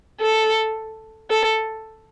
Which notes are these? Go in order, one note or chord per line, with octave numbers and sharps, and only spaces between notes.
A4
A4